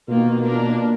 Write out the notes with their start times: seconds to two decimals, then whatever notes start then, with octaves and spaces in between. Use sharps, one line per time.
0.08 B2 D#3 A#3 F4
0.42 A#3 D4 F4 A#4